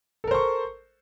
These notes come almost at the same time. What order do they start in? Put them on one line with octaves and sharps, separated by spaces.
A4 A#4 C5 C#6